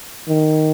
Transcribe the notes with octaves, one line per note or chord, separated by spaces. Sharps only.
D#3